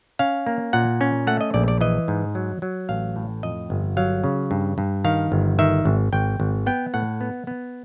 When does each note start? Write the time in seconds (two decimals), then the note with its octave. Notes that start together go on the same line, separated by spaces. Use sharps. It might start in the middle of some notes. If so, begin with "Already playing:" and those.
0.19 C#4 F5
0.46 A#3
0.73 A#2 F#5
1.01 C#4
1.27 A3 F#5
1.41 D#5
1.54 A#1 D5
1.68 D5
1.81 E3 D#5
2.08 G#2
2.35 F#3
2.62 F#3
2.89 A1 F5
3.16 A2
3.43 F2 D#5
3.70 G1
3.97 F#3 F5
4.24 C#3
4.51 G2
4.78 G2
5.05 D#3 F5
5.32 G1
5.59 D#3 E5
5.85 G#1
6.13 G#1 G5
6.40 G#1
6.66 B3 G5
6.94 A2 F#5
7.21 B3
7.47 B3